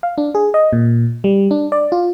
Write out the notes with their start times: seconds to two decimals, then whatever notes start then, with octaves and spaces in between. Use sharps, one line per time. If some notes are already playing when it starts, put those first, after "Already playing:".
0.03 F5
0.18 D4
0.35 G#4
0.54 D#5
0.73 A#2
1.24 G3
1.51 D4
1.72 D5
1.92 F4